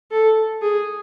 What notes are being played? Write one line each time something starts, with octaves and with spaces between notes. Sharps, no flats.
A4
G#4